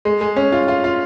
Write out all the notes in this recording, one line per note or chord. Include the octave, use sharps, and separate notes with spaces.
G#3
G#3
C#4
F4
F4
F4